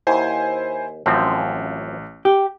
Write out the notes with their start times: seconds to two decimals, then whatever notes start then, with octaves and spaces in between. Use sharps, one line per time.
0.07 D#2 E4 C5 G#5
1.06 A1 F#2 F3 C4
2.25 G4